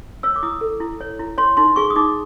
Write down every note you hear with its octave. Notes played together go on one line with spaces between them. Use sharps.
C#5 E6
D6
E4 D#6
A4
E4
C#5
E4
C#5 C6
D#4 C6
G#4 C#6
D#6
D#4 D6